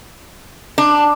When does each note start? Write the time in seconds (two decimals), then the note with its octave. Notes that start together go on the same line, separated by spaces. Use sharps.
0.78 D4